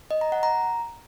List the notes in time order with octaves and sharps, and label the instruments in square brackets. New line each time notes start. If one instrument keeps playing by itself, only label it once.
[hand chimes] D#5
A#5
F#5
A#5